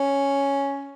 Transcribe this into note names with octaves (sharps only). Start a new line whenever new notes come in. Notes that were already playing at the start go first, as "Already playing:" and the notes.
Already playing: C#4